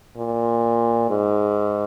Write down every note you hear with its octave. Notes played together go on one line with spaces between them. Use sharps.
A#2
G#2